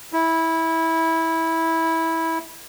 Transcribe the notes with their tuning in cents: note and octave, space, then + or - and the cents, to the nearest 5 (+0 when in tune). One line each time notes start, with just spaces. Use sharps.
E4 -15